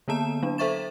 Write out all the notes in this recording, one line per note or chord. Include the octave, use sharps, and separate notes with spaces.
D3 A#3 B3 A5 E7
F#3 D4
A4 C5 E5 C#6 A6 E7